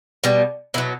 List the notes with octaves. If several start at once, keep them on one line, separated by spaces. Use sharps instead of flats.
B2 G3
B2 F#3 E4